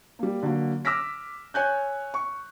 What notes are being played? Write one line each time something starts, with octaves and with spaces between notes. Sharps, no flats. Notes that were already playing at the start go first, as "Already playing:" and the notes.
G3 A#3
D3 F#3 A#3
D6 E6 F6 A#6 B6
C#5 G#5 F#6 G6
C#6